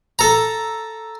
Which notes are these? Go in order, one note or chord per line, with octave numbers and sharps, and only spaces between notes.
A4 A#5